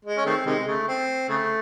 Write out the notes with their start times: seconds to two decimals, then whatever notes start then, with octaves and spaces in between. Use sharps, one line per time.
0.05 G#3
0.17 C#4
0.26 D#3 A3 C4
0.46 C3 D#3 G#3
0.67 C#3 A3
0.88 C4
1.29 C#3 A3